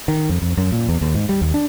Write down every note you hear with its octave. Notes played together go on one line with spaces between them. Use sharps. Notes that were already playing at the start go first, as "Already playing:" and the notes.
D#3
F2
F2
F#2
A#2
E2
D#2
G#2
G3
D#2
D4